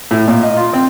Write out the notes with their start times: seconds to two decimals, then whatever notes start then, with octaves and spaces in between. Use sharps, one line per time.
0.11 A2
0.28 A#2
0.43 D#5
0.57 F4
0.73 C4